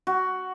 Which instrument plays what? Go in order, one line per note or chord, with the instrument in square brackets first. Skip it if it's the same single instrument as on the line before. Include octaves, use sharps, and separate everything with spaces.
[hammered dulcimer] F#4